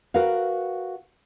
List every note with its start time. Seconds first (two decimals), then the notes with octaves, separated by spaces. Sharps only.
0.14 F#4 A#4 B4 F5